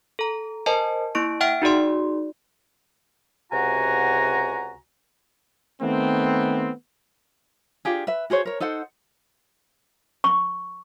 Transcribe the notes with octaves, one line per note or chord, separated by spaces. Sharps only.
A4 A#5
A#4 C5 D#5 G#5 A5
A#3 E4 C#6 D7
E5 F#5 G5 F6 D7
D#4 F#4 G#4 D5 C6
C#2 C3 F#4 F#5 G#5 A#5
D#3 A3 B3 C4
D4 F4 G4 G#4
B4 E5
F#4 G#4 C5 C#5
A#4 C#5
D#4 A4 C5 F#5
C#6